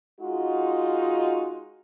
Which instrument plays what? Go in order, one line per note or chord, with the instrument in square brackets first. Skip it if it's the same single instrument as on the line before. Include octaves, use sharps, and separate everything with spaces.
[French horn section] G#3 D#4 F4 F#4